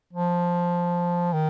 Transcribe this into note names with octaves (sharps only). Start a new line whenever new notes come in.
F3
D#3